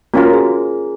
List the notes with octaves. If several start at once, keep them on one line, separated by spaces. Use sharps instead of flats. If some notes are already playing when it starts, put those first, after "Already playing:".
A#3 C#4 F4 F#4 A#4
G#4